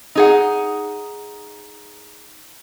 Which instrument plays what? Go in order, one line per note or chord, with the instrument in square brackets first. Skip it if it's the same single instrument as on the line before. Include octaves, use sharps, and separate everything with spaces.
[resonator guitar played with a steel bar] D#4 G#4 F#5